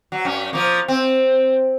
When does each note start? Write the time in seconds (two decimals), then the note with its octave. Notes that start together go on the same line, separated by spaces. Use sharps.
0.12 F#3
0.25 F#2 C#4
0.53 F3 A#3
0.88 C4